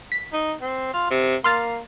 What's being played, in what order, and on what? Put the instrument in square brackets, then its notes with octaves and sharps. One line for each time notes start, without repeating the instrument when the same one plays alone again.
[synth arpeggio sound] B6
[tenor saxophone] D#4
C4
F4
C3
[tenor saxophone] A#3 [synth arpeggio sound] C6 F6 A6